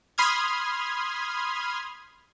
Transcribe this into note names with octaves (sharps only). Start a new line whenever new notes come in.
B5 C6 D#6 F6 G#6